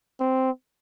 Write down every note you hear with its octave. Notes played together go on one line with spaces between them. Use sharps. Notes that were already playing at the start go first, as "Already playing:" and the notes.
C4